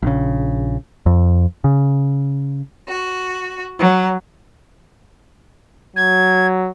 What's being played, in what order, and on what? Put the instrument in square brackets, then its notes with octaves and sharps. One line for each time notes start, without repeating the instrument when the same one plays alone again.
[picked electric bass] A#1 C#3
F2
C#3
[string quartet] F#4
F#3
[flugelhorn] F#3 [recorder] G#6